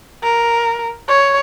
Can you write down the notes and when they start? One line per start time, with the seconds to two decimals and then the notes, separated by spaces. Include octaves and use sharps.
0.23 A#4
1.08 C#5